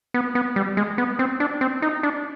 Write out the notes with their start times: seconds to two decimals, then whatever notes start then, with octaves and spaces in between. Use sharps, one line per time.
0.14 B3
0.35 B3
0.56 G3
0.77 G#3
0.98 B3
1.19 C4
1.40 D4
1.61 C4
1.82 D#4
2.03 D4